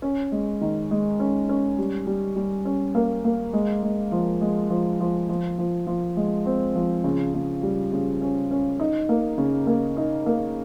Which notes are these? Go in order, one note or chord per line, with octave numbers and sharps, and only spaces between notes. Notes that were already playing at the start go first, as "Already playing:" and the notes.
C#4
G#3
D#3
G#3
C#4
C#4
G3
G3
G3
C#4
A#3
A#3
G#3
G#3
F3
G#3
F3
F3
F3
F3
F3
G#3
C4
F3
C#3
C#3
G3
C#3
C#4
C#4
D#4
A#3
C#3
A#3
D#4
A#3